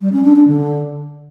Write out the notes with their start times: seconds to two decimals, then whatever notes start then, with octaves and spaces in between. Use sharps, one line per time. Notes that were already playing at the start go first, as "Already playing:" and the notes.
0.01 G3
0.12 C#4
0.24 D4
0.36 D4
0.47 D3